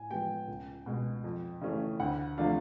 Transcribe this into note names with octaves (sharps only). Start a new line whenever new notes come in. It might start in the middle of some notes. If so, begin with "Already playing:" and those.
Already playing: A2 G#5
F3 G#3 B3 G5
C#2
B2 G#3
F2
C#3 E3 A3 C#4
D2 F#5
C3 F3 A3 D4 F5